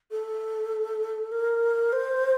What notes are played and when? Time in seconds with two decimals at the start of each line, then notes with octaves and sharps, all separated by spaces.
0.11 A4
1.31 A#4
1.92 C5